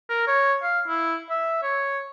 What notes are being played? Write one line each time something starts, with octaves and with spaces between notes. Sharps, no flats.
A#4
C#5
F5
E4
E5
C#5